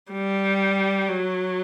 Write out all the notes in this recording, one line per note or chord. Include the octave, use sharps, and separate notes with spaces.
G3
F#3